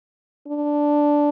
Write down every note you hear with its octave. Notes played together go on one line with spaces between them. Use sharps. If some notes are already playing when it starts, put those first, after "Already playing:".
D4